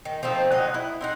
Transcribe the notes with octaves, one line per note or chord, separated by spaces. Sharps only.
D#3
F3 A3 C4 D#4
D3 F#3 D#4 D#5
E4
C4 D#4 F#5